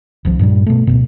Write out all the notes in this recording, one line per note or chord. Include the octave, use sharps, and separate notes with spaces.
D#1 C2 F3
G2 A#2 E3 G3
B2 A3
D1 D#2 B2